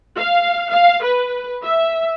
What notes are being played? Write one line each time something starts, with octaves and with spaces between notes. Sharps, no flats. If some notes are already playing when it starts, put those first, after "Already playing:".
F5
F5
B4
E5